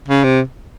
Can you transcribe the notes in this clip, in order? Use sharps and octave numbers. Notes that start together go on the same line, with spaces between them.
C#3
C3